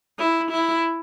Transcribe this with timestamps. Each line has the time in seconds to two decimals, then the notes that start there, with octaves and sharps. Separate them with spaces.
0.18 E4
0.51 E4